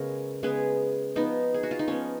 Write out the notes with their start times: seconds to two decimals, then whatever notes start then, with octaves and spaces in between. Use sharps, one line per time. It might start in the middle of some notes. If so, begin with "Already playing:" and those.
Already playing: C#3 G#3 B3 A#4 C#5
0.43 C#3 G#3 B3 G#4 B4
1.16 F3 B3 D#4
1.54 G#4
1.63 F#4
1.71 F4
1.79 D#4
1.88 F3 B3 C#4